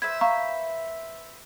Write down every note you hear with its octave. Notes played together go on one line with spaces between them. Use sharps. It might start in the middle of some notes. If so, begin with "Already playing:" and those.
B4 C5 E5 G#6
F5 A#5 C#6